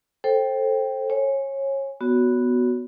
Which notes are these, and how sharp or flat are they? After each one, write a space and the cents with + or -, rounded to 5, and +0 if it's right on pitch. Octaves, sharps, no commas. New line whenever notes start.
A4 +0 C5 +20 G5 +0
C#5 -25 G#5 +0
B3 +0 F#4 +0 C#5 +25